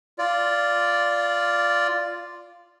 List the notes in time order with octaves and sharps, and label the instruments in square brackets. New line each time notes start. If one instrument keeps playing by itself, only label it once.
[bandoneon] F4 D5